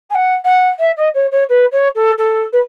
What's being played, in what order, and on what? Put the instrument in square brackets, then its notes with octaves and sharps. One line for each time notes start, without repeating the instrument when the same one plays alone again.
[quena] G#5
F#5
F#5
E5
D#5
C#5
C#5
B4
C#5
A4
A4
B4